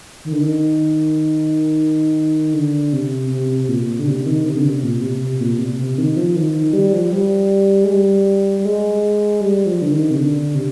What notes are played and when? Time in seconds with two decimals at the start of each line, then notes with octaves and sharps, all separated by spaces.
0.25 D#3
0.33 D3
0.40 D#3
2.54 D3
2.93 C3
3.30 C3
3.59 C3
3.69 A#2
3.99 D3
4.07 C3
4.26 D#3
4.45 C3
4.56 D3
4.64 C3
4.78 C3
4.83 A#2
5.01 C3
5.21 C3
5.40 A#2
5.59 C3
5.79 C3
5.98 D#3
6.17 F3
6.36 D#3
6.54 D#3
6.73 G3
6.93 F3
7.13 G3
7.84 G#3
7.89 G3
8.59 G3
8.65 G#3
9.41 G3
9.66 F3
9.82 D3
9.91 D#3
10.11 C3
10.17 D3
10.55 C3